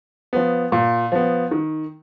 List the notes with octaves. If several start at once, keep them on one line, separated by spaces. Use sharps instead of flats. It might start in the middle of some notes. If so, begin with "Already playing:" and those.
F3 B3
A#2
F3 B3
D#3